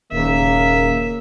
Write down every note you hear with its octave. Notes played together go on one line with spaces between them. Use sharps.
D#1 C#3 A#3 E5